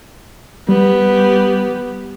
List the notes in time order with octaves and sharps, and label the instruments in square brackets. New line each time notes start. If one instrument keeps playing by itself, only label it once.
[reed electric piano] G3 [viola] B3 G4